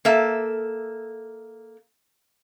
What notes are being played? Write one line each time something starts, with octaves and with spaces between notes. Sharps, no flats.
A#3 A4 E5